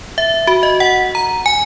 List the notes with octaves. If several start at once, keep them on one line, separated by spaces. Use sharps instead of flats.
E5
F#4
D#5
F#5
A#5
G#5